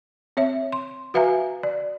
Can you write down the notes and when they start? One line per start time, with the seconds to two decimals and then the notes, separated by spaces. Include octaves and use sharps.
0.37 C4 C#5 E5
0.72 C6
1.14 F#4 B4 E5 F5 G#5 A#5
1.63 D5